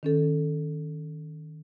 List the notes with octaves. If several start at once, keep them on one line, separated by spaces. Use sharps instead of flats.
D#3 C#4 A4